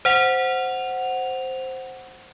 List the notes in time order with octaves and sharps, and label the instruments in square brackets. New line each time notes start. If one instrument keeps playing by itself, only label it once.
[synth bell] C5 F#5 F7